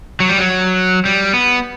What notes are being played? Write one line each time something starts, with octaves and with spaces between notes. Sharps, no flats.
F#3
G3
F#3
G3
B3